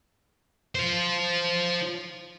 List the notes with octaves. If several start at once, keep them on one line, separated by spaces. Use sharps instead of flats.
F4 C5